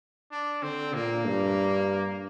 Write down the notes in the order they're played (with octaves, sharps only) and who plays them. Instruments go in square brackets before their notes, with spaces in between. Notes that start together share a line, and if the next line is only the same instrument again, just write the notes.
[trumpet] D4
[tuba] D3 [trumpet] C4
[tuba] A#2 [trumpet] A#3
[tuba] G2